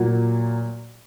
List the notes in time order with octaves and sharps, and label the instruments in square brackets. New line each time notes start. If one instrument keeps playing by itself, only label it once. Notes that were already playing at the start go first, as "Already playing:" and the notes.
Already playing: [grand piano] A#2 F#3 A#3